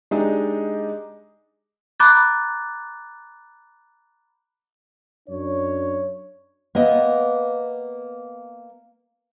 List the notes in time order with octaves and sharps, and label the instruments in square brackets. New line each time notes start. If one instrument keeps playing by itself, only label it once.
[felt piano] G#3 D4 D#4 G4 D#5
[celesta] A#5 B5 D6 F#6 G6 A6
[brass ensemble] F#2 D4 C#5
[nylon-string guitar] A#3 B3 D#5